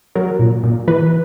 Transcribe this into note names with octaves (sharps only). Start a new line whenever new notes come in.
F#3 A#4
A#2
A#2
E3 B4